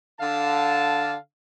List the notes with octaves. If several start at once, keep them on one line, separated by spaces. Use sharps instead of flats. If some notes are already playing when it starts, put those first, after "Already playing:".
D3 F5 A5